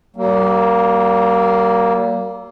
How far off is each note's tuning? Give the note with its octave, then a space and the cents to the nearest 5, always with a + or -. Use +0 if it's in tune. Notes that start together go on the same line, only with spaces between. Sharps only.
G3 -45 A#3 +0